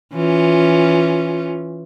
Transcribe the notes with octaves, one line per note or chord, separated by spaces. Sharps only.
E3 C#4 F4